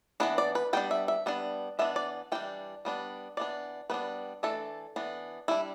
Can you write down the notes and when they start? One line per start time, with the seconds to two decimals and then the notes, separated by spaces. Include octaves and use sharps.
0.20 E3 B3 D4 B4
0.38 D5
0.55 B4
0.73 G3 B3 D4 G5
0.91 E5
1.08 E5
1.26 G3 B3 D4
1.79 E3 B3 D4 E5
1.96 D5
2.32 E3 G3 D4 G5
2.85 G3 B3 D4
3.37 E3 B3 D4 D5
3.90 G3 B3 D4 B4
4.43 E3 A3 D4 A4
4.96 E3 B3 D4
5.48 G3 D4 E4